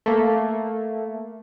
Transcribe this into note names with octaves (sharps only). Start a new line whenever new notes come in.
A3 A#3